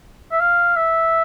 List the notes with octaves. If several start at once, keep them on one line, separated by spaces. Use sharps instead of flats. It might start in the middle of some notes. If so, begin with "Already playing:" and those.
E5
F5
E5